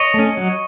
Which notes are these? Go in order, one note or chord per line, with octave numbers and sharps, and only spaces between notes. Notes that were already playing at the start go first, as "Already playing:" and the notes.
Already playing: C#5 D#5
A3
C#4
F#3